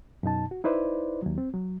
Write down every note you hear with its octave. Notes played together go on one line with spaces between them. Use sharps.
F#2 B2 D#4 A5
F#4
D#4 E4 B4 C5 D5
D#2 F#3
C4
F#3